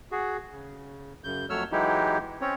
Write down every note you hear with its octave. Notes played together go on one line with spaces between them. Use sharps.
F#4 G#4
C#3
F#2 C#3 G6
F2 F#3 A3 C#5 E6 F6
E3 F#3 G#3 D#4 E4 G4
C4 C#4 C#5